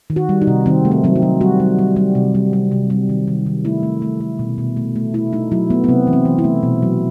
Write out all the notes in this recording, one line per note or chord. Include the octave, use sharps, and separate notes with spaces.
D#3
F#4
G3
D#4
C3
D#3 C4
A3
C4
F#3 C4
D#4
F#3
G3 F#4
G3
G3
G3
C3
G3
G3
C3
G3
D#3
D#3
D#3
A3 E4
A3
A3
A3
B2
B2
A3
A3
A3 E4
A3 D#4
F#3 E4
A3 B3
B3
C3 C4
E3
C4
E3
E4
A3
B2
F#3